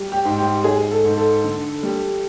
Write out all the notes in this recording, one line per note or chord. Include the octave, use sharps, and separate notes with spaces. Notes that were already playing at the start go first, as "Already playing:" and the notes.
Already playing: G3
G4
G#2
G4
G#2 G#4
A4
G#2
A4
D3
G3